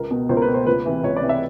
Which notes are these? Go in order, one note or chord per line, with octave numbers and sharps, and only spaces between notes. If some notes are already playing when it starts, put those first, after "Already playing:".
Already playing: C#2 A#4
B2
C#2 C5
A#4
B4
B2
C5
C#2 B4
C3 E3
C#2 C#5
D5
C3 E3
E5